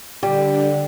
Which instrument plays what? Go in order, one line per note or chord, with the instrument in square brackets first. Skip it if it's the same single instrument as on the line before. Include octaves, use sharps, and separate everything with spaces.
[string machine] D3 [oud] G3 [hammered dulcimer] G4